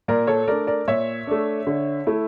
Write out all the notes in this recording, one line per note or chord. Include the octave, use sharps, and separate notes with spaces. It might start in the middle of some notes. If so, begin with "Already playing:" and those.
A#2 A#4 D5
A4 C#5
A3 D4 A#4 D5
A#4 D5
A#2 C#5 E5
A3 D4
D3
A3 E4